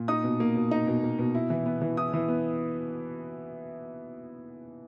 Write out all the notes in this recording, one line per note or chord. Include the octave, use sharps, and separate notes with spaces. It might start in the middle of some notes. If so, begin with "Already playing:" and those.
Already playing: A#2
D#4 D#6
B2
A#3
B2
D#4
B2
A#3
B2
E4
E3
B3
E3
E4 D#6
E3
B3